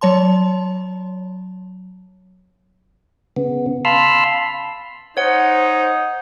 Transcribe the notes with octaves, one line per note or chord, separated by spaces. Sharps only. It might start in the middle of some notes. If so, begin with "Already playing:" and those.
F#3 C#5 A5 C6
C#3 B3
F5 A5 B5 C6 E6 F6
D#4 C5 C#5 F#5